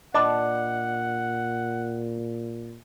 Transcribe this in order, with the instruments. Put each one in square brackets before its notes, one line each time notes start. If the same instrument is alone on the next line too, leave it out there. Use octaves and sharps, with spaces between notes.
[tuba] A#2 [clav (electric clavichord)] D4 A5 [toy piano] D#5 B5 D6 [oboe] F#5